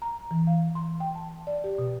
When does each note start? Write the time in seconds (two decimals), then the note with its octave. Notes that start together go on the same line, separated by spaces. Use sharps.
0.02 A#5
0.31 E3
0.47 F5
0.75 C6
1.00 G5
1.15 A5
1.47 D5
1.64 G4
1.78 B2